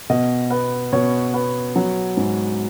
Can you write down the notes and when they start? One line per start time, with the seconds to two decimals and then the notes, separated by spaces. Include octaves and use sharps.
0.10 B2 D#5
0.51 B3
0.93 B2 C#5
1.34 B3
1.76 F#3
2.17 G#2